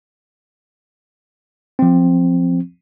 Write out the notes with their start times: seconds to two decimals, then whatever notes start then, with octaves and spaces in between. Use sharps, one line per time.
1.79 F3 C4